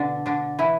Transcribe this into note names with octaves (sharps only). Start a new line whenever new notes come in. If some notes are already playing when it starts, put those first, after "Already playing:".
Already playing: B2 D3 D4
D3 D4
E3 E4